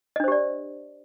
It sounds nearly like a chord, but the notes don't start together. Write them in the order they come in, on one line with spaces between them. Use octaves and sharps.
D#5 D4 C5 G4 D5